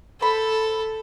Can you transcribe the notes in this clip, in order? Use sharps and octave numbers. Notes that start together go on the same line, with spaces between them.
A4 C5 B5